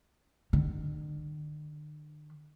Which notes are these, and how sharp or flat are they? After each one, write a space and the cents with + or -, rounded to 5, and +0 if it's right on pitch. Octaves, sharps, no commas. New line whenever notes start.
D3 +45